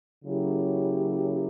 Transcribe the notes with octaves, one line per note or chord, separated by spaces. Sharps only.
C#3 F#3 A#3 E4 G4